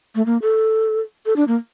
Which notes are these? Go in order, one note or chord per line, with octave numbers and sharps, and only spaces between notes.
A3
A#3
A4
A4
D4
A#3